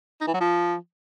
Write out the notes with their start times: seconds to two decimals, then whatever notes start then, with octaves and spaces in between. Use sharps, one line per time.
0.21 D#4
0.27 E3
0.34 F#3
0.41 F3